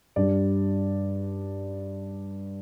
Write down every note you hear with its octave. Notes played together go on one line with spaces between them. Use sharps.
G2 G3 D4 D5